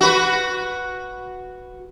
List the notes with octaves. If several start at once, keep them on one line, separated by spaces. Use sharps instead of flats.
F#4 B4